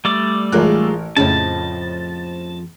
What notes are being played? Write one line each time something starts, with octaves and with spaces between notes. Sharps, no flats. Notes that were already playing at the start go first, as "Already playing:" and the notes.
G3 A3 D5
A1 G#3 D#4 F4 A#4 F#6
F2 A2 C#3 F3 D#5 A5